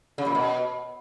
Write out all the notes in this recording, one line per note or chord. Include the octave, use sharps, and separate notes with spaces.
C#3
A#2
B2